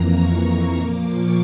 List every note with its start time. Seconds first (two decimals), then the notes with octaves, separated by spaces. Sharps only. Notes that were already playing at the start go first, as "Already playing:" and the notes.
Already playing: F2 E3 A#3 A#5
0.09 C#6
0.42 C#6
0.76 A#2 F3 A#3 D6
1.09 C#6